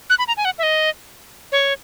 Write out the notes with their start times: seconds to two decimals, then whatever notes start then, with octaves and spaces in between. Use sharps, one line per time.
0.10 F#6
0.19 B5
0.28 A#5
0.37 G#5
0.45 F#5
0.58 E5
0.63 D#5
1.52 C#5